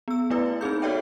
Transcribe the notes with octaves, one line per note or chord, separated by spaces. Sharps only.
B3 E6
A3 B3 E4 B4 D5
C4 D#4 G#4 G6
F#4 A4 C#5 D5 E5 G5